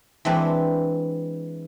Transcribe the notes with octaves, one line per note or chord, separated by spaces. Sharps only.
E3 G#3 C4 D4 B4